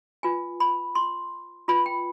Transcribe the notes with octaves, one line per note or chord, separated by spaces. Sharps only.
F4 B4 G#5
B5
C6
F4 B4 B5
G5